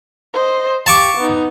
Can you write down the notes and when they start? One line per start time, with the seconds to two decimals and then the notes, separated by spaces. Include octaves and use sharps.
0.34 C5 D#5
0.86 G4 F5 A5 C#6 D6
1.17 B3 D#4